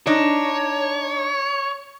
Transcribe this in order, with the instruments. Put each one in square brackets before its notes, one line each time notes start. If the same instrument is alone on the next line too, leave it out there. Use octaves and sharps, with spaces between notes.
[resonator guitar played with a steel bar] D4 D#4 [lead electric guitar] C#5